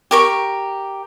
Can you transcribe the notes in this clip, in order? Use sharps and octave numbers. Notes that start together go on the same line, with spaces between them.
G4 A#4 C#6